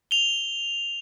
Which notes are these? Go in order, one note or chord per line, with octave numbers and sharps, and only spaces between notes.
F7 G7